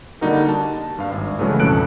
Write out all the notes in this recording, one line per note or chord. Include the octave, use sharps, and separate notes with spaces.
D3 G3 A#3 D#4 F#4 A#4
A5
G2 F5
G#1
C#3 E3 F#3 G#3 A3
B1 F2 A4 F#6 D7